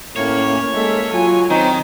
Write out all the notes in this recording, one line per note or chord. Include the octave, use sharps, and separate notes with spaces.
A2 A#3 C#4 C#5
G#3 A#3 A4 E5
F#3 F4 G#5
D#3 C4 D#4